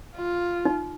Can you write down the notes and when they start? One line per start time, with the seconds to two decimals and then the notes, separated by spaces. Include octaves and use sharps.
0.16 F4
0.65 D#4